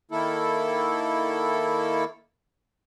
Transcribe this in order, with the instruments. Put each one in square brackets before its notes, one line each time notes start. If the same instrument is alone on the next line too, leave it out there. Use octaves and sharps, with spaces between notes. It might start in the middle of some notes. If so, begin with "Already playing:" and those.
[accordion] D#3 A#3 E4 A4